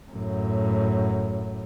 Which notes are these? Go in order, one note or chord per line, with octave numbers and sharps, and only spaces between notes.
F#2 A2